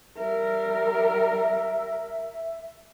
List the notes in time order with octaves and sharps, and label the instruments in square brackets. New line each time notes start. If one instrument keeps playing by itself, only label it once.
[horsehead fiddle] G3 A#4 [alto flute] E5